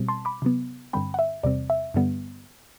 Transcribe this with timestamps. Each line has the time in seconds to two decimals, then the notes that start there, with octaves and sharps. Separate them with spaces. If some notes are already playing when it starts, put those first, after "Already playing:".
Already playing: B2 G3 C4
0.08 A5 C6
0.25 B5 D6
0.42 C3 F#3 B3
0.93 G2 D3 G3 C4 G5 B5
1.14 F#5
1.19 E5
1.43 E2 C3 G3 C4 D5
1.70 E5
1.94 G2 D3 G3 B3